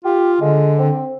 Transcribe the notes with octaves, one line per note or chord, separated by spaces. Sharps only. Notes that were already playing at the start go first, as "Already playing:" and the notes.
F4 G4
D3 G#3
C4